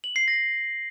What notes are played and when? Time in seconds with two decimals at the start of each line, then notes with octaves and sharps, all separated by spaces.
0.04 F#7
0.16 C7
0.28 A#6